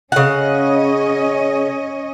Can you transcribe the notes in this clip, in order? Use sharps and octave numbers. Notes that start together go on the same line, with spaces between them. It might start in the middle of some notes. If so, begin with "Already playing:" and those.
C#3 C#4 C#5 D#5 F#5